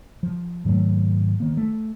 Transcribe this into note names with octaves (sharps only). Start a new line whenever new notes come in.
F3
G#2 D#3 F#3 A3
D#3 A#3
A3